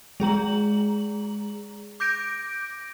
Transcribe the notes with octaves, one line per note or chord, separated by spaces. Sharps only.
G#3 G#4 A#5 F#7
D6 G6 A#6 D7